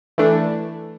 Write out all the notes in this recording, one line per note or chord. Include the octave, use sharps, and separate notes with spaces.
E3 A3 D4